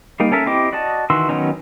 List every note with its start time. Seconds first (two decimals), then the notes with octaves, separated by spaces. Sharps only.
0.20 G3 A#3 D#4
0.32 C#4 A4 A#4 E5
0.46 C4 E4 G4 D#5 D6
0.72 F#4 D5 D#5 A5
1.10 D#3 E3 F#4 C6 E6
1.29 D#3 F#3 B3 C#4 D#4